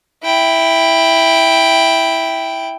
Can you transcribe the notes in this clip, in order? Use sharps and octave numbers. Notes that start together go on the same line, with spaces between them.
E4 G5